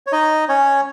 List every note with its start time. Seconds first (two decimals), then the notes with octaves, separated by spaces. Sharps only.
0.07 C#5
0.12 D#4 D#5
0.49 C#4 C#5